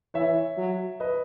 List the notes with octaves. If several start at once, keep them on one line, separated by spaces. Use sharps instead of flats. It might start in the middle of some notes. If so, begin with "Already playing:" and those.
E3 C#5 E5
F#3
B4 D#5